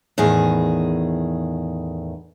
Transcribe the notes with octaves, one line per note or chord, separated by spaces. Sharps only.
E2 A2 D#3 G#4